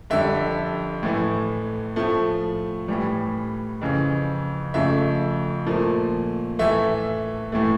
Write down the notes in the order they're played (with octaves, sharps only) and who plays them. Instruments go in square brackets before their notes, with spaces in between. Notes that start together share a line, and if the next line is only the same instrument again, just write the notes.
[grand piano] F2 D3 G3 E5
A2 E3 A3
A2 F3 A3
A2 E3 G3
F2 C#3 E3
F2 C#3 F3 A3 E5
A#2 F3 A3
A2 E3 A3 E5
A2 E3 A3